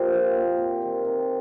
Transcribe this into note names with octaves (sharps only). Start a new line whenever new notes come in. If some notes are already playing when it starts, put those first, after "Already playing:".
Already playing: A#2 G4 C5
F3
A#2
C3
D#3
C3